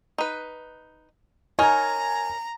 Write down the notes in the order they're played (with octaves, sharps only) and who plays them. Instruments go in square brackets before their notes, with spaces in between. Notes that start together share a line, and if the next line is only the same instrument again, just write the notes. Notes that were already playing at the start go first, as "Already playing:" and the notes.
[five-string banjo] D#4 B4
[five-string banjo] D#4 A#4 C#5 [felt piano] G#5 [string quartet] A#5